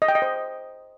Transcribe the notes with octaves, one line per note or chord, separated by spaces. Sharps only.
D#5
G5
D#5
C5